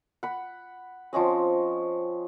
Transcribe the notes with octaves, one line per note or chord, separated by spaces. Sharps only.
F#5 B5
F3 C4 C#4 D#5